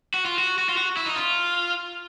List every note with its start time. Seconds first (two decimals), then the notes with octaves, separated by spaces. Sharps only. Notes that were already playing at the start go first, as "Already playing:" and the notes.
0.14 F#4
0.26 F4
0.38 F#4
0.58 F#4
0.69 F4
0.77 F#4
0.97 E4
1.06 D#4
1.16 F4